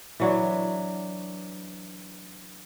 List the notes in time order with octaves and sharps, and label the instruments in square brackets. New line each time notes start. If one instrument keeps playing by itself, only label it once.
[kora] E3 F#3 D4